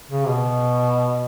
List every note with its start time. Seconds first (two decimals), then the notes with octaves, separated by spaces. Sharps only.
0.09 C#3
0.28 B2